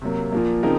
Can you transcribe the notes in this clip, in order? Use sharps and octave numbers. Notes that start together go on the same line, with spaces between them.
C3 F#3 A#3
A#2 F3 A#3
C#3 F3 C4 D#4 A#4